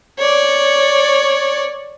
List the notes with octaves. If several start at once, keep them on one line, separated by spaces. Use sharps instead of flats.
C#5 D5